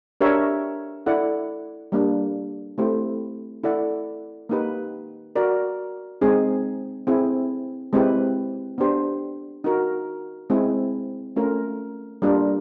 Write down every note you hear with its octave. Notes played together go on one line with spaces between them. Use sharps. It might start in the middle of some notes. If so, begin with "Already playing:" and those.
D4 G4 A#4 C#5 E5
E4 A4 D5 F#5
G3 A#3 D4
A3 C4 E4 G4 C5
E4 A4 D5 F#5
A#3 D#4 G4 B4
F#4 A#4 D5
G#3 C4 D#4 G#4
C4 E4 G#4
G#3 C4 E4 G4 B4
B3 D4 G4 C5
D#4 F#4 A#4
G#3 C4 E4 G#4
A3 C#4 F4 A#4
G3 A#3 D4 F4 A#4